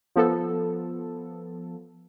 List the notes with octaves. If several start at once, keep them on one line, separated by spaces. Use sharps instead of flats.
F3 B3 A4